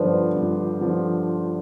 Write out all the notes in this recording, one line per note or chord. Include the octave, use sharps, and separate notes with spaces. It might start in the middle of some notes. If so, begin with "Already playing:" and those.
Already playing: G1 G2 D3 F3 B4 C5 D5
G1
D3 F3